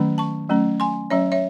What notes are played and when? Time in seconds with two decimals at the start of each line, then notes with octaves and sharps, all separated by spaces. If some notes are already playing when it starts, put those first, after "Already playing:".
Already playing: D#3 F#3 A3 C#4
0.18 A5 C#6
0.49 F#3 A3 C#4
0.80 G#5 C6
1.10 F#3 C#4 C#5 E5
1.32 C#5 E5